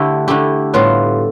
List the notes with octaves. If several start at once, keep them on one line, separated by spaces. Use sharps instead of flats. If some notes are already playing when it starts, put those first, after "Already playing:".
Already playing: D3 A3 E4 G4
D3 A3 E4 G4
A2 G3 B3 F4